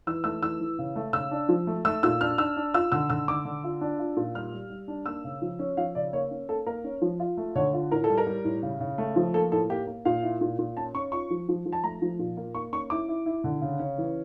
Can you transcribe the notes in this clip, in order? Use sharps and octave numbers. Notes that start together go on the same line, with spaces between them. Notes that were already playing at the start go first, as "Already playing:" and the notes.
E3 E6
A3 E6
E3 E6
E3
C#3
A3
C#3 E6
D4
F3
A3
A3 E6
A#2 E6
D4 F6
D4 E6
D4
F4 E6
D3 E6
D3 E6
D3 D6
D3
F4
D4
F4
A#2
G3 F6
G3
G3
D4
A#3 E6
C#3
F3
C#4
F3 F5
C#3 D5
A#3 C#5
C#4
A#3 A4
A#3 A#4
C#4
F3
F4
A3
D3 C#5
F4
A2 A#4
A4
G3
A#4
G3
A2
C#3
C#3
A3
F3
A#3 A4
A2 A4
A#3 G4
A#3
A#2 F5
E4
A#2
A#2
C#4 A5
C#4 C#6
F4 C#6
F3
F3
F3
A5
A3 A#5
F3
A#2
A#3
A#3 C#6
C#4 C#6
E4 D6
E4
E4
D3
C#3
C#4
E3